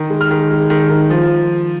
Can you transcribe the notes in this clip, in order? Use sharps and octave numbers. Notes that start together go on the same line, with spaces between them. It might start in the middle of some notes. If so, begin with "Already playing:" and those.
Already playing: D#3
G#3
F6
D#3
G#3
D#3
D#3
F3